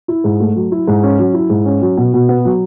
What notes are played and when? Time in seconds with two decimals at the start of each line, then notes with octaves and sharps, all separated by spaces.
0.08 E4
0.24 G#2
0.40 A3
0.56 F#3
0.72 E4
0.87 G#2
1.03 C#4
1.19 F#3
1.34 E4
1.50 G#2
1.66 C#4
1.81 F#3
1.97 B2
2.14 B2
2.29 B3
2.45 F#3